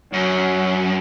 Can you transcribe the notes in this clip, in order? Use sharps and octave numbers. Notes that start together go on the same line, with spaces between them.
F#2 F#3